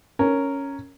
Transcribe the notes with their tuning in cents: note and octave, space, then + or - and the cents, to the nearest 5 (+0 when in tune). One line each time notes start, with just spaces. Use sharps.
C#4 +0 A#4 -5